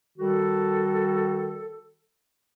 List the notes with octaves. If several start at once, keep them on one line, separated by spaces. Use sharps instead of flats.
D#3 G3 F#4 A4